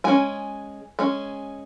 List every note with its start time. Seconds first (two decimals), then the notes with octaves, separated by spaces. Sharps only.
0.04 G#3 C#4 G#5
0.99 G#3 C#4